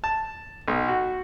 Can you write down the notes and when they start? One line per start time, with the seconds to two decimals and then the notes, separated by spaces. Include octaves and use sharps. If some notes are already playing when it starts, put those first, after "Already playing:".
0.04 A5
0.68 B1
0.88 F#4